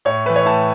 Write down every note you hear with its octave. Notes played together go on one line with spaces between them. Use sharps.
A2 C#5
E3 A3 B4
C#5
A2 A5